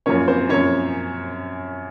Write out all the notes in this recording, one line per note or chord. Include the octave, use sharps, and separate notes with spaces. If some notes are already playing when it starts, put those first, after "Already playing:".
F#2 F3 A#3 C#4 C#5
C4 C5
F#2 F3 A#3 C#4 C#5